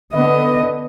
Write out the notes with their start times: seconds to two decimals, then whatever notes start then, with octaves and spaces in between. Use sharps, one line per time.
0.13 D3 B3 D#5